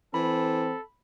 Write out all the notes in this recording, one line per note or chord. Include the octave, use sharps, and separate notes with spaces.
E3 C4 A4 B5